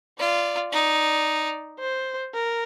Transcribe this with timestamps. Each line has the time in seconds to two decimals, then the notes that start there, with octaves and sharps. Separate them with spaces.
0.19 F4 D5
0.72 D#4 D5
1.80 C5
2.34 A#4